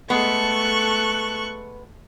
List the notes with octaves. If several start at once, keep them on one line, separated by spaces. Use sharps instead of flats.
G#3 A3 B3 A4 C#6 F#6